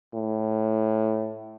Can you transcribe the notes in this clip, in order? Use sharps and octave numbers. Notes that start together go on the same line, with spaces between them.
A2